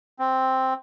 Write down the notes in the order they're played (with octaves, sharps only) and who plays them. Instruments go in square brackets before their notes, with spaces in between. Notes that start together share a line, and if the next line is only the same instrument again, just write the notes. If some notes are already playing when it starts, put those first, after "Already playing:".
[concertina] C4